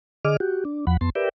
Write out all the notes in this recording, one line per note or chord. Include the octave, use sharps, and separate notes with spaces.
D3 G#4 D#5 D6 F6
F#4 G4
D4
E2 F3 F#5 B5
F2 B3 A5 C6
G4 A#4 B4 D5 E5 G5